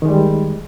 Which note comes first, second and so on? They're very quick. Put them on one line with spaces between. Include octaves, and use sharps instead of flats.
D#3 G#3 G3